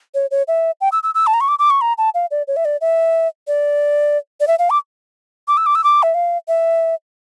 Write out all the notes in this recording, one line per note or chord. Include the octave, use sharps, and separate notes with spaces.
C#5
C#5
E5
G5
E6
E6
E6
A5
A#5
C#6
D6
D6
C#6
A#5
A5
F5
D5
C#5
E5
D5
E5
D5
D5
E5
F5
D6
D6
E6
D6
E6
D6
E5
F5
E5